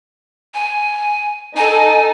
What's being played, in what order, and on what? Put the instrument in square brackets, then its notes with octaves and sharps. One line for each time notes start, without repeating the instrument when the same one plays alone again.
[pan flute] G#5
[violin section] D#4 A4 [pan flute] G#5